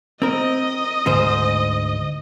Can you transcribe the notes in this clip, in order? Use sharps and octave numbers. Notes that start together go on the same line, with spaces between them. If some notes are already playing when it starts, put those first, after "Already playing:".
C4 A#4 D#5
D2 G#2 C5